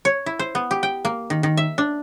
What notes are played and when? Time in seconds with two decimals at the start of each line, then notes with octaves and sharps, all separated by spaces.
0.05 C#5
0.26 E4
0.39 C5
0.55 B3
0.71 G4
0.83 G5
1.05 A#3
1.30 D#3
1.43 D#3
1.57 E5
1.78 D4